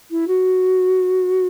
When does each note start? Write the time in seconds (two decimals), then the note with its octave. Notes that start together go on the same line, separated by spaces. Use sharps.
0.10 E4
0.27 F#4